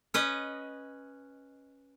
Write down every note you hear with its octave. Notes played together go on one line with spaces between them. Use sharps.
C#4 B4 D#5